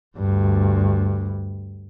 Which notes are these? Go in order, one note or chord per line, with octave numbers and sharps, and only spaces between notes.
D2 G2